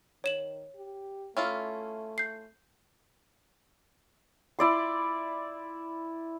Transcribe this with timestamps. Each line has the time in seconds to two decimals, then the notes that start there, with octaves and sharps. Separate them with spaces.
0.24 D#3 C#5 E7 F#7
0.75 G4
1.37 A3 C#4 E4 F4
2.18 G6 C7
4.59 E4 D5 C6